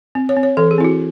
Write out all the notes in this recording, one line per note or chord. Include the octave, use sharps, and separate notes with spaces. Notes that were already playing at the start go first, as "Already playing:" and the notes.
C4
C#5
C4
C#5
E3 A4
G#4
C4 E4
F#4